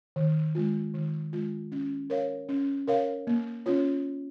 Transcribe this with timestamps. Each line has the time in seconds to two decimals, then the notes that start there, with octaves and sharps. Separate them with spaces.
0.16 D#3
0.55 G#3 F4
0.94 D#3
1.33 G#3 F4
1.72 C#4
2.10 A#4 C#5 F5
2.49 C#4
2.88 A#4 C#5 F5
3.27 A#3
3.66 C#4 F4 C#5